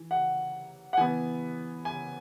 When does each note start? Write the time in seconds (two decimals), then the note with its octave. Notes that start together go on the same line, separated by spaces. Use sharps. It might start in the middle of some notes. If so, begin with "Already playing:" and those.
Already playing: E3
0.11 F#5
0.93 F#5
0.97 E3 B3 G#5
1.85 G#5